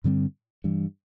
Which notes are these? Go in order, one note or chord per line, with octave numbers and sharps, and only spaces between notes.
G2 D3 G3 C4
G2 E3 G3